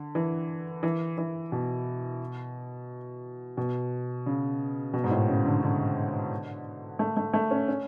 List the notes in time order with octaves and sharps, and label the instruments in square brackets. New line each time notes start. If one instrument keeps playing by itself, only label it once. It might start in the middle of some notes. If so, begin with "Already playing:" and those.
Already playing: [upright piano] D3
E3
E3
E3
B2
B2
C#3
B2
G#2
A2
C#3
D3
D3
A3
A3
A3
C#4
C#4